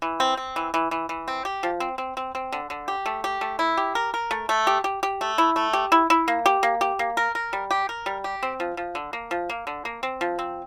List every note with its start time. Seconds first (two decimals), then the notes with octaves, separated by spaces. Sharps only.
0.02 E3
0.20 C4
0.37 C4
0.56 E3
0.74 E3
0.91 E3
1.09 E3
1.28 C4
1.45 G4
1.63 F3
1.80 C4
1.98 C4
2.17 C4
2.35 C4
2.52 D3
2.70 D3
2.88 G4
3.06 A3
3.24 G4
3.41 A3
3.59 E4
3.77 G4
3.95 A#4
4.14 A#4
4.31 A3
4.49 A3
4.67 G4
4.84 G4
5.03 G4
5.21 A3
5.38 E4
5.56 A3
5.73 G4
5.92 E4
6.10 E4
6.28 A#3
6.46 G4
6.63 A#3
6.81 G4
6.99 A#3
7.17 A#4
7.35 A#4
7.53 G3
7.71 G4
7.89 A#4
8.06 G3
8.24 G4
8.43 C4
8.60 F3
8.77 F3
8.95 D3
9.13 A#3
9.31 F3
9.50 A#3
9.67 D3
9.85 A#3
10.03 C4
10.21 F3
10.39 C4